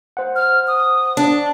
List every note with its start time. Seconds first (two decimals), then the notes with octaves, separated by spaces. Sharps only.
0.17 C5 F#5
0.36 F6
0.67 D#6
1.17 D4